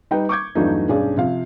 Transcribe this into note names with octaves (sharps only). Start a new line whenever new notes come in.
G3 D#4 B4 G5
C#6 D6 G6 G#6
E2 G2 F#3 A3 D4 D#4
B1 G2 C#4 G#4 D5
C3 F3 F5